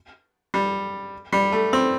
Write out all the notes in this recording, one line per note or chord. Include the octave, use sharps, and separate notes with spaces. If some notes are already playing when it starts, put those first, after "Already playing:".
G3
G3
A3
C4